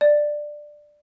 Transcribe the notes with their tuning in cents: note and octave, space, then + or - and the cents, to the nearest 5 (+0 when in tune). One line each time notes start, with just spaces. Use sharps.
D5 +10